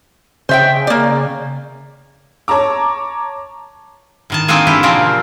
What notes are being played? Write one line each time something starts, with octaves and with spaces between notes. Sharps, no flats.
C#3 C5 E5 G5
A#3 D5
C#5 A5 A#5 D6
A2 D#3 A5
A#3 C4 D4 D#4 F4 G#4
E3 D4 E4 G4
A#2 C#3 F3 C4 A#4